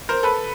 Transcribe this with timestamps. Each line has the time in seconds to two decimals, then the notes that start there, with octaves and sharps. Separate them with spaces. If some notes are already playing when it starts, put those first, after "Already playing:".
0.09 A#4 C5
0.23 A4 B4